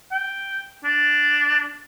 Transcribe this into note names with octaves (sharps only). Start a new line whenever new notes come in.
G5
D4